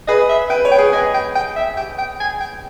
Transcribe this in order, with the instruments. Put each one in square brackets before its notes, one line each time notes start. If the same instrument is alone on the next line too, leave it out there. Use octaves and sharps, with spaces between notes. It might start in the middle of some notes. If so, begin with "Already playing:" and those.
[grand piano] G#4 B4 [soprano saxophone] D#5
[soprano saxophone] E5
[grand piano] B4 [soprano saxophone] G5
[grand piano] C#5
[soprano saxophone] G5
[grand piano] G#4 B4
[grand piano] B4 D#5 [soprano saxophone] G#5
[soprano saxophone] G5
G5
E5
G5
G5
G#5
G5